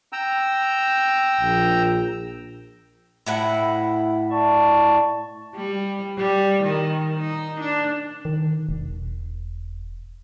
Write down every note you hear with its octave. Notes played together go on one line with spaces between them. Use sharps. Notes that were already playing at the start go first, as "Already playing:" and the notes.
G5 A#5 E6
A#1
A2 E4 F#5
D5 A5 C#6
G3
G3
D#3
D#4
D4
D#3
E1